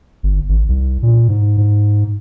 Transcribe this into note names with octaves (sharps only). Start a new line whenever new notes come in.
G1
G#1
C2
A#2
G#2
G#2